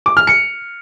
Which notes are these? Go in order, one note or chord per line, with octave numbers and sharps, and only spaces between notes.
D6
F6
C#7